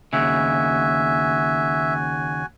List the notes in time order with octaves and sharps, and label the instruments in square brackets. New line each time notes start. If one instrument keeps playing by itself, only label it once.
[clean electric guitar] D#2 C#3 [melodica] F#4 G#5 [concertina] E5